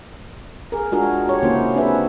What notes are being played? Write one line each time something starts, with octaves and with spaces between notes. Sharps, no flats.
G#4 A#4
G#3 D4 F4 F#4 G#4 A#4
G4 C#5
C#3 A#3 C#4 E4 F#4 C5
C#4
C4 D4 G#4 B4 E5